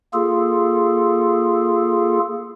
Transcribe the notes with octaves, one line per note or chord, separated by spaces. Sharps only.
A#3 F4 G#4 A4